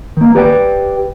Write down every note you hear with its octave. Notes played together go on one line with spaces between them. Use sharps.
D#3 A#3
G4 B4 D5 F#5 G5